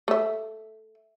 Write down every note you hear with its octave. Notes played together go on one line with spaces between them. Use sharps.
A3 E5